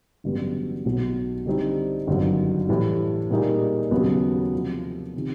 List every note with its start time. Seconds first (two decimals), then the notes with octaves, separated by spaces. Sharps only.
0.24 A1 G2 D3 F#3 B3
0.85 B1 B2 F#3
1.46 D3 G3 C4 D#4
2.07 G1 F#2 D#3 F#3
2.69 A2 E3 G3
3.31 A#2 G3 A#3 D#4 G#4
3.91 D#2 C#3 F#3 B3
4.53 C3 F3 A3
5.16 C3 D#3